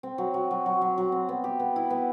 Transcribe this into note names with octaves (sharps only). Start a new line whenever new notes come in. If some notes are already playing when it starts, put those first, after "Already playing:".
C4
F#3
F#3
F#3
F#3
F#3
F#3
C4
B3
G4
B3
E4
B3